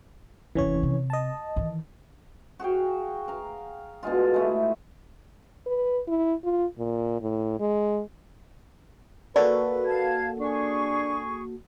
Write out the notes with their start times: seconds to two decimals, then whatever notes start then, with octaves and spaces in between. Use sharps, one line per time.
0.55 F1 D#2 E3 C#4 C#5
0.83 C3
1.10 D#5 A5
1.56 D#3 E3
2.59 F#4 G#4 F5 G5
3.28 F5 A#5
4.03 B2 D3 G#3 F4
4.34 G#3 A3 E4
5.66 B4
6.08 E4
6.44 F4
6.79 A#2
7.21 A2
7.60 G#3
9.36 A#3 F#4 A4 B4 D5
9.86 F5 A5 G#6
10.40 D4 G#4 C#6